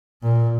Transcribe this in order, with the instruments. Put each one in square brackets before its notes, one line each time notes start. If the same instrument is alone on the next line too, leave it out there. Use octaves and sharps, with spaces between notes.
[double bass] A#2